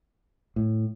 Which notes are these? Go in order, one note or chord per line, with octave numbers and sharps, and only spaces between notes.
A2